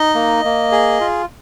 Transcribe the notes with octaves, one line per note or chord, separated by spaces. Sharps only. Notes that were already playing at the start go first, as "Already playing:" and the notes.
Already playing: D#4 D#5
A#3
A#3
G#4
F4